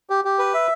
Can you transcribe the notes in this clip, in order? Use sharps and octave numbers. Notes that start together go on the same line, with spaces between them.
G4
G4
B4
E5